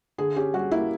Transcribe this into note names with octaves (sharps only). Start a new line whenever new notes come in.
D3 G#4
C#4 G4
G3 F#4
A#3 E4